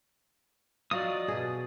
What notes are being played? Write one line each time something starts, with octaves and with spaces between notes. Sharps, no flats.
F#3 F4 D5 D#5 D#6
B2 G#4